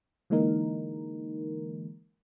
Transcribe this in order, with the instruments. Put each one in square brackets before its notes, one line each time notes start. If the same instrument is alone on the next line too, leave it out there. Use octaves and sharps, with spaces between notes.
[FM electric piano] D3 E3 G#3 A#3 D#4 A#4